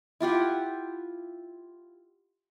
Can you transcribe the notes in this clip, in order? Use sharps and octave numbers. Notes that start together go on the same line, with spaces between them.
E4 F4 G4 F#5